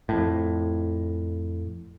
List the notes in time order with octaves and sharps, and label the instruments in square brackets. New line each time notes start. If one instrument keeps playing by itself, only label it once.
[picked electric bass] F2 A2